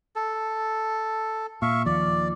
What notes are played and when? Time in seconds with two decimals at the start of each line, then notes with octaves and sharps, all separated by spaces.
0.16 A4
1.62 A#2 E5 F5 C#6
1.86 D#2 F3 D5